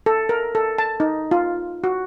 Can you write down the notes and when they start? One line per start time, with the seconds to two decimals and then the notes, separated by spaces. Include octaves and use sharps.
0.06 A4
0.29 A#4
0.55 A4
0.78 A5
1.00 D#4
1.31 F4
1.84 F#4